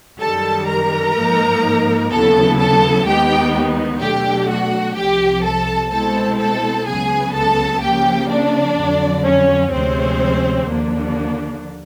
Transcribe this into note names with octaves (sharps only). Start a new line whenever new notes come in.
F#2 D#3 G3 A4 A5
A#4 A#5
G#2 F3 A#3 D#4
D#2 C#3 F#3 B3 E4 A4 A5
A4 A5
D#2 D#3 G#3 B3 D#4 G4 G5
B2 F#3 A3 D4 G4 G5
F#4 F#5
C2 C3 F3 G4 G5
A4 A5
B2 G#3 C4 E4 A4 A5
A4 A5
C#2 C#3 F#3 B3 G#4 G#5
A4 A5
C#3 F3 A#3 G4 G5
D4 D5
F2 D3 F#3
C#4 C#5
D2 C3 F3 G#3 C4 C#4 C5
D#2 D3 F3 A#3 D4